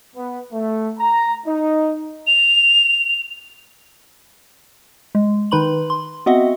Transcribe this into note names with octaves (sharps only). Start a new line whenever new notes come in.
B3
A3
A#5
D#4
F7
G#3
D#3 D#4 B4 B5 C6 F#7
C6
B3 C4 F#4 D#5 E5 F#5